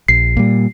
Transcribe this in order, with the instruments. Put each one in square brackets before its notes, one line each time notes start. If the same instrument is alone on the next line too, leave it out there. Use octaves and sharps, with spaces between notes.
[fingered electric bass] A#1 [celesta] C7
[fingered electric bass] A#2 G3